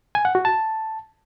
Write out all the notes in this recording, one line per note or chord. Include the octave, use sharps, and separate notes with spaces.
G#5
F#5
F#4
A5